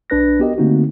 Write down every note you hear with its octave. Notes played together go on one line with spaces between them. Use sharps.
B1 D4 B4 F#6 A#6
B3 F#4 G4 A#4 D#5
D3 A3 A#3 C4 D#4 F#4